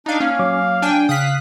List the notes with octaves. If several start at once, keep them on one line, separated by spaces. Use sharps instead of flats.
D4 D#4 F5
A#3 C#4 F5
F#3 C#5 D6
D4 G5 G#5
C#3 F5 D#6 F#6 B6